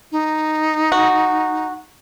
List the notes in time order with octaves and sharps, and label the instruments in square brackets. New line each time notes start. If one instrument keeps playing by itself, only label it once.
[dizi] D#4
[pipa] F#4